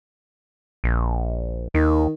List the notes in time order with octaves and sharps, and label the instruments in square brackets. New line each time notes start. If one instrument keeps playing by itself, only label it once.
[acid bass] A#1
[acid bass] D#2 [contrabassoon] D#3